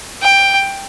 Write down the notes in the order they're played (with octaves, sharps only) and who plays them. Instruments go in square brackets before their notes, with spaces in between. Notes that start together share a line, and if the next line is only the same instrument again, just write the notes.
[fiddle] G5